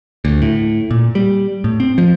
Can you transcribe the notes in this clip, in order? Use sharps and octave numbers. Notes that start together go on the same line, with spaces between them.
D2
A2
A#2
G3
A2
C4
F3